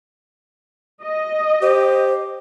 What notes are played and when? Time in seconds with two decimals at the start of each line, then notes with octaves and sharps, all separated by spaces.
1.03 D#5
1.62 G4 C5